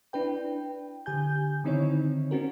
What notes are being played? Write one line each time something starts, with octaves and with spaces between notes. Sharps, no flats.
D4 E4 B4 G5
D3 G4 G#5 G6
D3 D#3 C4 D#4 E4 C#5
C4 C#4 F#4 A#4